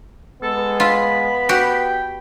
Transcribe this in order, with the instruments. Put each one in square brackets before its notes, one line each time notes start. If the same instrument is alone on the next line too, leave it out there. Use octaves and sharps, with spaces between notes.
[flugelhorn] G#3 [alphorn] B3 [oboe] A4
[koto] F4 [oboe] B5
[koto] F#4 G4 [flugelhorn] G5